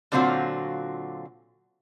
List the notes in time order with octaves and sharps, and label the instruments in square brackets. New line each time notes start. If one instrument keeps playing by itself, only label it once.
[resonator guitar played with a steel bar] A#2 D3 F#3 C4 F4 F#4